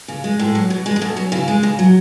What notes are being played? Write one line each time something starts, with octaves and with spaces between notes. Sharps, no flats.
C#3
G#3
A2 G#3
F#3
B2
G#3
G#3
B2 A3
F#3 C#4
C#3 E4
G#3
C#3
F#3